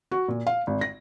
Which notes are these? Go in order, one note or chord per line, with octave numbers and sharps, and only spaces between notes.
F#4
A#2
F5
G#1
A#6